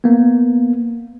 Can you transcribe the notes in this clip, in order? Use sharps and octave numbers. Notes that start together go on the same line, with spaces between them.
A#3 B3